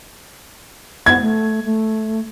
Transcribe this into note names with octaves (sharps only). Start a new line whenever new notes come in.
F#5 G#6
A3
A3